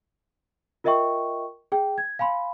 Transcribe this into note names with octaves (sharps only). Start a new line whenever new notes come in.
F4 A#4 D#5 E5 G5 C#6
G#4 G5
G#6
F5 G#5 B5 C6